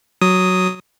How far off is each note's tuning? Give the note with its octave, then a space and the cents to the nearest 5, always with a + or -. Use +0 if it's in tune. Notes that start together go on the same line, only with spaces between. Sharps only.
F#3 +0 D#6 +0